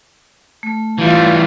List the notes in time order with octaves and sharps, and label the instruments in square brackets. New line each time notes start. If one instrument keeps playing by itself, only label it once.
[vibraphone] A3
[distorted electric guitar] E3 G3 [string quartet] F4 E5